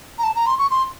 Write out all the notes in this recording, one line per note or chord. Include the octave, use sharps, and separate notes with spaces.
A#5
A5
A#5
C6
C#6
C6